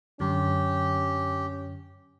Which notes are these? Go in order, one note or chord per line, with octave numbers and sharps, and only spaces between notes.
F#2 D3 C#4 G4